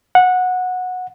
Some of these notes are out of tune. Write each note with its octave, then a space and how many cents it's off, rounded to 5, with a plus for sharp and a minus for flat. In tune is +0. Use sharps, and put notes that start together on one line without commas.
F#5 -15